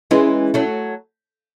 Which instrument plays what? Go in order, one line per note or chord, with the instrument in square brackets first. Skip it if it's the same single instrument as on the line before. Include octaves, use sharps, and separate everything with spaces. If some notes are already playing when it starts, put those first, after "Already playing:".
[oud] E3 G#3 [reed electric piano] C#4 E4
[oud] F#3 A3